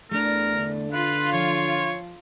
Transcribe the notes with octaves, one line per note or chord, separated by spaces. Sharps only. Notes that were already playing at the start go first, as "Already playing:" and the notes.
E2 A3 D4 A#4
D3
F4 B4
F3 C#5